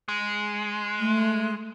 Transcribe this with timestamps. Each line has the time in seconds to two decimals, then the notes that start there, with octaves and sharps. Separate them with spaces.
0.08 G#3
0.99 A3